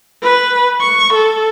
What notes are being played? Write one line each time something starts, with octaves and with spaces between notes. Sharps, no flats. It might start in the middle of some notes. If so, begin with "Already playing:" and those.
B4
C#6
A4